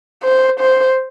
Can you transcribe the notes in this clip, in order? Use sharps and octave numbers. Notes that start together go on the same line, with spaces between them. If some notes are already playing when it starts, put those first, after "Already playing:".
C5
C5